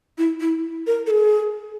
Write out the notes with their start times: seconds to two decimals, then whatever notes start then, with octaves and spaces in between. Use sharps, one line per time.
0.18 E4
0.40 E4
0.87 A#4
1.07 A4
1.11 G#4